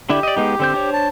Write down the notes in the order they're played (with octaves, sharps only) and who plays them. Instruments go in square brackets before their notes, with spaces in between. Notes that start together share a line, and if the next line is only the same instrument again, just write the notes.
[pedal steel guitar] D3 D4 E4 [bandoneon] G4
[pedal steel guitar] D5 D#5
G#3 B3 D#4
D3 C4 G6
D4 C5 C#5
[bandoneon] A5